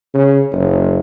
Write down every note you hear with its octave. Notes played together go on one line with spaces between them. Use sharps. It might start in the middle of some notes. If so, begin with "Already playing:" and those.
C#3
F#1